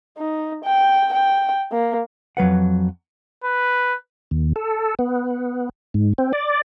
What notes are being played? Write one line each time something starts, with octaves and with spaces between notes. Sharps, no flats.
D#4
G5
G5
A#3
F2 F#3 B4 F#5
B4
D#2
A4
B3
G#2
C4
D5